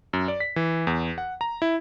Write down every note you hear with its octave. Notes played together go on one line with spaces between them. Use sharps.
F#2
D5
B6
E3
E2
F#5
A#5
E4